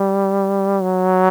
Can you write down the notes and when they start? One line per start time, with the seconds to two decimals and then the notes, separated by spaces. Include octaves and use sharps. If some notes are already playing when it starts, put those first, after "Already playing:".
Already playing: G3
0.82 F#3